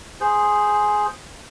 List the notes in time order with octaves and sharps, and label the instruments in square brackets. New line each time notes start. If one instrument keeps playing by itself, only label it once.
[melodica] G#4 C5